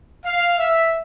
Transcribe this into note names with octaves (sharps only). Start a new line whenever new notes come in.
F5
E5